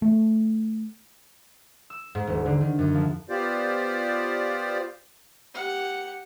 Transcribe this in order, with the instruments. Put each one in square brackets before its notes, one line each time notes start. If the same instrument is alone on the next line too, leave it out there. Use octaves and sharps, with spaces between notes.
[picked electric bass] A3
[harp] E6
G#2
D#1
D3
D#3
F#2
F3
[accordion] B3 F4 G4 C5 D5
[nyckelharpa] G4 F#5